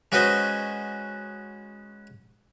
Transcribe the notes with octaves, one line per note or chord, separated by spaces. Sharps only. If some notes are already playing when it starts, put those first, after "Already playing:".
G#3 C#4 F#4 B4 C5 D#5